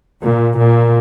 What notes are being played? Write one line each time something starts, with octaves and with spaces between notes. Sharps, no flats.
A#2
A#2